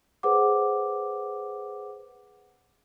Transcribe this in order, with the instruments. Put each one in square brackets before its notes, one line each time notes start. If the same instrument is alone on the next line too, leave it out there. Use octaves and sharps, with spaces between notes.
[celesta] G#4 B4 C5 F#5 D6